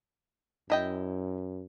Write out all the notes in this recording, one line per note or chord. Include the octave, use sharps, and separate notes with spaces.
F#2 E4 D#5 G5